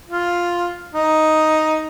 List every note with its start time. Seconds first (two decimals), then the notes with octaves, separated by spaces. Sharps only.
0.09 F4
0.93 D#4